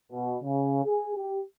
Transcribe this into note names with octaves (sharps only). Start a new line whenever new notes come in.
B2
C#3
G#4
G4